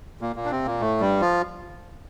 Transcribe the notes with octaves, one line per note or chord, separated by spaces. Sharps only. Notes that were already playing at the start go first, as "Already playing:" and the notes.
A#2 A#3
A#2 A#3
D4
C3 C4
A#2 A#3
A2 A3
G2 G3
F3 F4